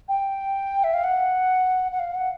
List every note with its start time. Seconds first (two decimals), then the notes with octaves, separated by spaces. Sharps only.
0.09 G5
0.84 E5
0.94 F5
1.04 F#5
1.92 F#5
1.99 F5
2.15 F#5